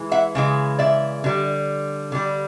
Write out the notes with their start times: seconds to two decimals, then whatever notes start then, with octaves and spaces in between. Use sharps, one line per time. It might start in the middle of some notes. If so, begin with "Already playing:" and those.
Already playing: E3 G#3
0.12 E5 F#5
0.35 C#3 E3 G#3
0.79 D5 E5
1.24 D3 G3
2.12 D3 G3